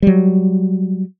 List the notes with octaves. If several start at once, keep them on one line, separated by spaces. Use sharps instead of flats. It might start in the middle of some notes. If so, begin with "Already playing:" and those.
F#3 G3